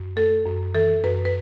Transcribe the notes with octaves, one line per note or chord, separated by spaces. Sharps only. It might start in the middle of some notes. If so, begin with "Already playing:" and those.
Already playing: F#2
A3 A4
F#2
E3 A4
F#2 B4
B4